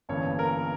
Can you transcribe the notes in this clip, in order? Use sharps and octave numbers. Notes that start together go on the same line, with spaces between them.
G1 G2 E3 A#3 C#4 C#5
A#4